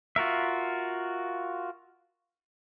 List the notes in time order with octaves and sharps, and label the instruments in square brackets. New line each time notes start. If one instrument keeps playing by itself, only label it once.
[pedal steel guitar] F4 F#4 A#4 E5